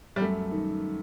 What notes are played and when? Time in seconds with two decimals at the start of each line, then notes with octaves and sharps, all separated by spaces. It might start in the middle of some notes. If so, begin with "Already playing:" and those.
0.16 G3
0.20 F#2 A3
0.51 D#3